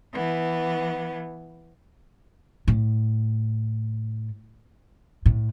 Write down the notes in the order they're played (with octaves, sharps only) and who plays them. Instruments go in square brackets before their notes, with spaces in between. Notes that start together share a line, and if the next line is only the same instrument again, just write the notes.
[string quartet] E3 B3
[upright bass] A2
A2